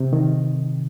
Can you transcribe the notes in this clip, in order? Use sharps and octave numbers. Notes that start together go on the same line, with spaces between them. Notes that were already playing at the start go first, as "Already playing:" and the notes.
Already playing: C3
D#3